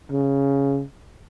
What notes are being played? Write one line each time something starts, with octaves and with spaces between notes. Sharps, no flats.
C#3